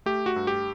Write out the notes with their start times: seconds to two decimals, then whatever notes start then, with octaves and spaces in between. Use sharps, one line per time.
0.06 A3 G4
0.26 F#4
0.36 G2
0.47 G4